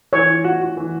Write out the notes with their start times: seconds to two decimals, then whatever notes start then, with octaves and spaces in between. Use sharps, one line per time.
0.13 E3 C#5
0.29 E3
0.44 F#4
0.62 F#4
0.77 E3